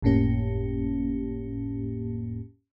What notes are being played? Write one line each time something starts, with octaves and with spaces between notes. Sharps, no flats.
G1 F2 A2 A#3 C#4 G4